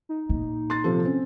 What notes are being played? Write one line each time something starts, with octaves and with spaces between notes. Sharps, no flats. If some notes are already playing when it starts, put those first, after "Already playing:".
D#4
A#2
C6 A6
C3 F3 A4
C4 C#4